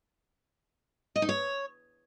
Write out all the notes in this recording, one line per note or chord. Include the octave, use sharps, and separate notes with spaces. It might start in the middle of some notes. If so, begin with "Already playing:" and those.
D#5
D#4
C#5